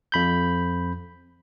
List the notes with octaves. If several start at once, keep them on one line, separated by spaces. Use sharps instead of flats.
F2 B5 G6